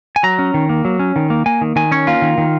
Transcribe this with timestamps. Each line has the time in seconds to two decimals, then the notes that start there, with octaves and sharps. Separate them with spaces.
0.16 G#5
0.23 F#3 A#5
0.39 C#4
0.54 D#3
0.69 A#3
0.85 F#3
0.99 C#4
1.16 D#3
1.30 A#3
1.46 A#3 G#5
1.61 D#3
1.76 D#3 G#5
1.91 C#4 C#5
2.07 A#3 F4
2.22 D#3
2.38 D#3